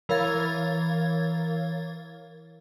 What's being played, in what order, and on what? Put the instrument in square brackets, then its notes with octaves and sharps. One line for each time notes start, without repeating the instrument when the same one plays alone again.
[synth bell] E3 A#4 C#5 F5 G#6 A6